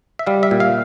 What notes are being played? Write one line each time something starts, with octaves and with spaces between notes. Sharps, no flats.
E5
G3 F5
E5
A#2
F5